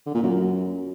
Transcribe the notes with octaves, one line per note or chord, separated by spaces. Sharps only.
D3
A#2
F#2